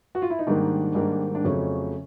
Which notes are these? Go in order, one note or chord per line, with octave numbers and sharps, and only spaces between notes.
F#4
F4
E4
D#4
G#2 D#3 G3 A#3 D4
G#2 D#3 G3 A#3 D4
D4
F2 C#3 F#3 A3 C#4